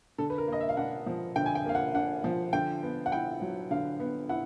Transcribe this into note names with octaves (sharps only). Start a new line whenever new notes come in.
D3 A4
B4
A#4
A#3 D#5
E5
F5
D4 F#5
F3
D3 G5
G#5
G5
A#3 F5
F#5
D4 F#5
F3
D3 G5
B3
F#5
E4 G5
F#3
D3 F5
B3
E4 F#5